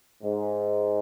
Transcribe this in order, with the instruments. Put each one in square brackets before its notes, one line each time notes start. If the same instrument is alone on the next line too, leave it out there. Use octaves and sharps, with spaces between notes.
[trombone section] G#2